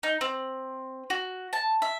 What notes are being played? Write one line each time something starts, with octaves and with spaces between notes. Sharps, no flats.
D#4
C4
F#4
A5
E5